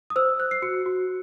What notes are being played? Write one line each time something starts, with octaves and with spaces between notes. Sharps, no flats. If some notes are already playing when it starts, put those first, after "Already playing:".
D#6
C5 E6
C5 F#6
C7
F#4 C#7
F#4